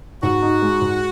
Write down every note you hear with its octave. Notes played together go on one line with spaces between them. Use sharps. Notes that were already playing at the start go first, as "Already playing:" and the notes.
G#2 F#4
D#4
G#3
G#2